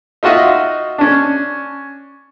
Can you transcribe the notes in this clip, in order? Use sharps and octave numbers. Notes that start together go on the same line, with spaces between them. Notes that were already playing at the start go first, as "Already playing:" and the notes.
D#4 F4 F#4 D#5 E5
C#4 D4